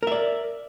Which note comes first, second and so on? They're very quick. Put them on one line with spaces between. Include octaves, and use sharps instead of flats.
A#4 E5 D5